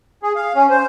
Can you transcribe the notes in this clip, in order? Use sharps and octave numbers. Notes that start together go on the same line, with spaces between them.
G#4
F5
C#4
C5